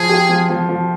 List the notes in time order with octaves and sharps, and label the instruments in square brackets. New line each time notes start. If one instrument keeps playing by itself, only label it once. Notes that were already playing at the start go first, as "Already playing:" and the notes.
Already playing: [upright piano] F3 [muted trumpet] G#4
[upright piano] G4
F3
F3
F3